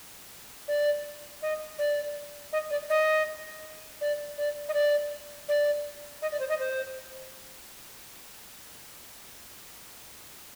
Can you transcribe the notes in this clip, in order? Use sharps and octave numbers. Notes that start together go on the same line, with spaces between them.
D5
D#5
D5
D#5
D5
D#5
D5
D5
D#5
D5
D5
D#5
D5
C5
D#5
C5